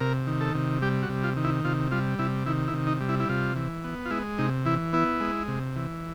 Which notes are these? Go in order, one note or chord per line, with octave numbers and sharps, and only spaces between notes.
C3 A#4
D#3
A4
C3
G3 G4
F#4
C3
F4
D#3
E4
C3 F4
G3 F4
C3 E4
D#3 E4
E4
C3
D#4
G3
E4
E4
C3 F4
E3
B3
F4
G#3 E4
C3 D#4
E3 E4
B3 E4
G#3
C3
E3